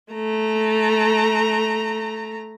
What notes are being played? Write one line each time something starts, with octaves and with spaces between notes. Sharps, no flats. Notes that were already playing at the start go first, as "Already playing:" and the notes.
A3 A#5